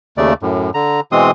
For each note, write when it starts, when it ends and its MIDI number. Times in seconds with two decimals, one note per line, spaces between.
0.17 0.33 39
0.17 0.33 49
0.17 0.33 57
0.17 0.33 74
0.42 0.70 42
0.42 0.70 45
0.74 1.00 50
0.74 1.00 82
1.12 1.31 47
1.12 1.31 52
1.12 1.31 56
1.12 1.31 60
1.12 1.31 84
1.12 1.31 87